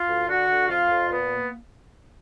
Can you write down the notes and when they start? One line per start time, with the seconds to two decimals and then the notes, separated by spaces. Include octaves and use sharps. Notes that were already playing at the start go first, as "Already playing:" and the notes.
Already playing: F4 F5
0.08 D2
0.28 D3 F#4 F#5
0.48 D3
0.68 F2 F4 F5
0.89 F2
1.09 A#2 B3 B4
1.29 A#3